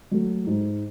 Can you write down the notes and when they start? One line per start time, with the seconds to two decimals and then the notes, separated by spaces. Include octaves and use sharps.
0.11 F#3 A3
0.47 G#2